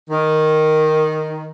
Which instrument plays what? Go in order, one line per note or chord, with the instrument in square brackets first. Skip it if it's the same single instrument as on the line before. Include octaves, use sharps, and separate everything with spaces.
[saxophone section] D#3